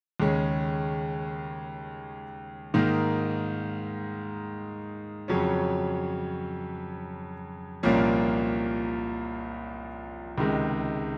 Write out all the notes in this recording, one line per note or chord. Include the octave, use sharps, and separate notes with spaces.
D#2 C#3 G#3 C#4
G#2 D#3 A#3 D#4
F2 C#3 F#3 C#4
C2 A#2 F3 A#3 C#4
C#2 C3 D#3 G#3